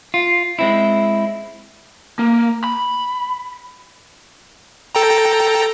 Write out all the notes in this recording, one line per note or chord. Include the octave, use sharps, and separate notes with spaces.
F4
G#3 C4 E4
A#3
B5
A4 G5 A#5